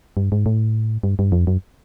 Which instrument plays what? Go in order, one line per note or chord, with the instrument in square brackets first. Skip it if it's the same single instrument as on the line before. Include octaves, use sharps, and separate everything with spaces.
[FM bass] G2
G#2
A2
G2
G2
F2
F#2